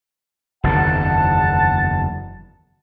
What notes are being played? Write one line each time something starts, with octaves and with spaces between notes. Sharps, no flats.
F#1 E2 D#3 F#5 A5